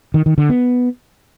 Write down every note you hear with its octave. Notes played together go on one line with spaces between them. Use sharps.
D#3
D#3
D3
B3